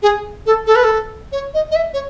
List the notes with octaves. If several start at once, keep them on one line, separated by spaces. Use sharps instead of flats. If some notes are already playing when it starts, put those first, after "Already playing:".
G#4
A4
A4
B4
A4
C#5
D#5
D#5
E5
C#5